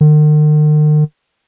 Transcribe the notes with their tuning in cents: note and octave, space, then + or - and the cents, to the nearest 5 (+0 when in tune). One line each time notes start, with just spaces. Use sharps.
D#3 -45